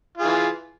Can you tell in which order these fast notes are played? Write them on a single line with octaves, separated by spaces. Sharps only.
F4 G#4 E3